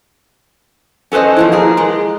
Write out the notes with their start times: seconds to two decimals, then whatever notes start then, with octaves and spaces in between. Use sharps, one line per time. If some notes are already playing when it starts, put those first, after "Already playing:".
1.12 C#4 A4 B4 C5 D#5
1.36 B2 F3 E4
1.52 A#2 G#4 A#4
1.77 G#3